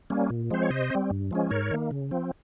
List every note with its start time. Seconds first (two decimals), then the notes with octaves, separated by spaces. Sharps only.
0.10 G3 A#3 C#4
0.30 A#2
0.51 F3 G#3 C4 C5
0.62 C#5
0.70 C3 C5 D#5
0.91 G3 C4
1.10 G2
1.31 F3 G#3 C#4
1.51 G#2 A#4 C#5
1.71 D#3 A#3
1.91 C#3
2.11 F3 C4